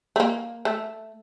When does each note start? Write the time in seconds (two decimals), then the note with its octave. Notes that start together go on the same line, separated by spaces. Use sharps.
0.16 A3
0.20 A#3
0.65 A3